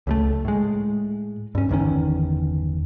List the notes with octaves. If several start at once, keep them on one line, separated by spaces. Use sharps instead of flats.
C#2 G3 A3
A2 G#3
G2 C#4
G1 E2 D#3 C#4